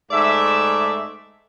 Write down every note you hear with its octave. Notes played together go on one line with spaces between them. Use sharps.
G#2 G#3 A3 D5 E5